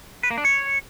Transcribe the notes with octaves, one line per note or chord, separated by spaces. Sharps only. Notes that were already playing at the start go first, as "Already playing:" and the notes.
B4
A#3
D4
C#5